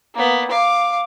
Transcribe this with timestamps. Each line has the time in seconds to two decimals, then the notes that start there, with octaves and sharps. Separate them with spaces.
0.15 A#3 B3
0.51 F5 D6